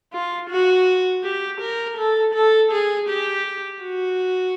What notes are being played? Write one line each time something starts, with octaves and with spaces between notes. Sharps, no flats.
F4
F#4
G4
A#4
A4
A4
G#4
G4
F#4